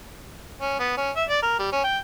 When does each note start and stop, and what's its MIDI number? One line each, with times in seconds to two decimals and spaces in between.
0.61 0.79 61
0.80 0.94 59
0.97 1.11 61
1.16 1.24 76
1.30 1.42 74
1.43 1.57 70
1.59 1.70 55
1.72 1.82 61
1.84 1.99 79